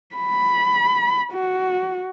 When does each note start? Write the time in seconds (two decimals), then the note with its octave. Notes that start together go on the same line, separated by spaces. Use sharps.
0.16 B5
1.33 F#4